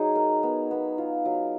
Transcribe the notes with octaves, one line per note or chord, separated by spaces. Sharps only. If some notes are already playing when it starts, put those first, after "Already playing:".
Already playing: F#3 D#4 G#4
A#4
B3
B3
F4
F#3